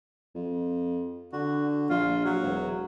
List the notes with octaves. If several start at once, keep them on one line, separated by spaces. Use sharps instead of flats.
F2
D3 F#4
A#1 F4
F#3
E1